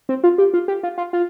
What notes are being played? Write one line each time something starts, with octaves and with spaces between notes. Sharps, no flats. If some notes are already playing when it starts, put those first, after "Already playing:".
C4
F4
G4
F4
G4
F4
F4
F4